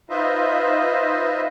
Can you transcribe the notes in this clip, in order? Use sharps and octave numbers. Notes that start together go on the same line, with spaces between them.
D#4 F4 B4 C5 D#5 E5